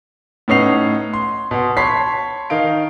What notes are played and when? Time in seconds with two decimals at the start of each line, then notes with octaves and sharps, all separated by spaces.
0.48 A2 B3 C#4 D#4 C7 F7
1.14 C6
1.51 B2 C6
1.77 C#5 A5 B5 C6 B6 C7
2.50 D#3 D#4 F5 D7